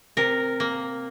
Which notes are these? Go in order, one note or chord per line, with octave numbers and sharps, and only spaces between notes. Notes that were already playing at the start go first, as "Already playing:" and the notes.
C3 A#4
A#3